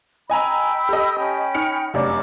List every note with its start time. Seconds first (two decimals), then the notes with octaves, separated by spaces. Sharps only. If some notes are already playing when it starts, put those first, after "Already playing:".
0.30 D#5 G5 G#5 A#5 B5 E6
0.89 G4 A4 D#5
1.17 C#4 G5 B5
1.55 D#4 F6 C#7
1.94 F1 F#2 D4 D#5 D6